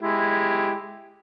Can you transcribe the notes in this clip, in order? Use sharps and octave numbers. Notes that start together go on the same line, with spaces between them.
G#3 E4 G4